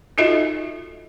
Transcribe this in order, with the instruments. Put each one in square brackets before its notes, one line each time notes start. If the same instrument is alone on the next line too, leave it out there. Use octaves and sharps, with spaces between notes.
[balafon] D#4 F4 F#4 A4 D#5 E5